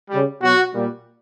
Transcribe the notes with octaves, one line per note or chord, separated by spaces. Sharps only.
C#3 G3
B2 F#3 F#4
A#2 G3